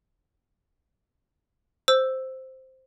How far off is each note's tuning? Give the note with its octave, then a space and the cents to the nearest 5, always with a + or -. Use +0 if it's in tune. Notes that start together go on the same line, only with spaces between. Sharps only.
C5 +0 E6 +0